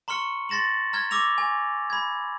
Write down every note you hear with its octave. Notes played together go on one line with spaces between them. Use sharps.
A#5 C6 C#6 F6 C#7 G7
C6 A6 A#6 E7 F#7
A#5 F6 G#6 G7
D6 E6 A#6 F7
G#5
B5 G#6